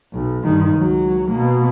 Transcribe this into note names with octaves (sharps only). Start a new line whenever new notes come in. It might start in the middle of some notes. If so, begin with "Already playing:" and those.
B1
G2 D#3
C#2 F#3
B2 A#3